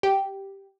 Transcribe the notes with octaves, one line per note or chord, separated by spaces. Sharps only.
G4